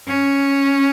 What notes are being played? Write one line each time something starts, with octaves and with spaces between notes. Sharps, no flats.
C#4